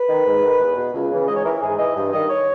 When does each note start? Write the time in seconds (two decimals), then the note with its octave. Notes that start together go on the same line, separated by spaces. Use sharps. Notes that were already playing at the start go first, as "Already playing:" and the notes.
Already playing: B4
0.09 D#3
0.26 G#2
0.43 D#3
0.61 E2
0.77 B2
0.94 C#2
1.11 C#3 E3
1.28 G#2 D#5
1.36 C#5
1.44 E3 A#4
1.62 G#2 G#4
1.79 E3 D#5
1.96 G2
2.13 D#3 D#5
2.30 C#5